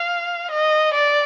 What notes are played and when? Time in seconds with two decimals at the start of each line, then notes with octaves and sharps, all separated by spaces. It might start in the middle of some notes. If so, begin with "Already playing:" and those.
Already playing: F5
0.51 D#5
0.94 D5